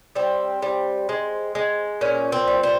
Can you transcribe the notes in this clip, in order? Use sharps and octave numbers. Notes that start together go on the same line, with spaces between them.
G3 C4
G3
G#3
G#3
A#2 C#4
C4
G3
C4